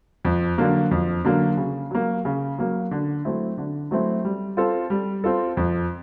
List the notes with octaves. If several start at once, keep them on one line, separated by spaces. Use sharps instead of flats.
F2
D3 F#3 A#3
F2
D3 F#3 A#3
C#3
F#3 A#3
C#3
F#3 A#3
D3
F#3 A3 C4 E4
D3
F#3 A3 C4 E4
G3
C4 F4 A4
G3
C4 F4 A4
F2